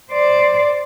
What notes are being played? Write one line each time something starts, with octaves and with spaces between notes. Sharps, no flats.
C5 D5